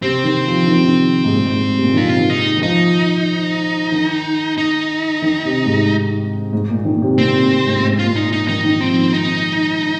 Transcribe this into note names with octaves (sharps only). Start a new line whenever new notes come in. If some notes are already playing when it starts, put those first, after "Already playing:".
C3 C4
D#3
F3
D#3
C3
D#3
G#2
A#2
G#2
C3
A#2
D#3
C3 F4
D#3
D#4
D#3
F3 D#4
D#3
D#4
D#3
C3
G#2
G#2
A#2
D#3
A#2
C3
A#2 C4
C3
A#2
G#2
G#2
F4
A#2
D#4
D#4
D#3 D#4
D#3
F3 C4
D#3
D#4